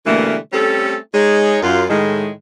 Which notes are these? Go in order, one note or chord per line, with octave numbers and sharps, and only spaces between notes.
B2 D3 E3 G3 A3 A#3
G3 A3 C4 C#4 A4
G#3 D#4 C#5
F#2 F4
A2 D#3 G#3